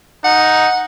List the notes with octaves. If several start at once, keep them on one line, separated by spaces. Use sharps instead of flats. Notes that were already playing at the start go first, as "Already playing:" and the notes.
D#4 F#5